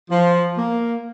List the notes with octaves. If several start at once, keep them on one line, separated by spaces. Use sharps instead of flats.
F3
A#3